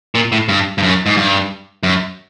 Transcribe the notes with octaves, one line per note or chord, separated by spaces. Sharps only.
A#2
A2
G2
G2
F#2
G#2
G2
F#2